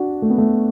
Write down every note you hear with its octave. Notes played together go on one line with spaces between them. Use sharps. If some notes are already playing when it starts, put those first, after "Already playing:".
Already playing: D4 F#4
A3
B3
A3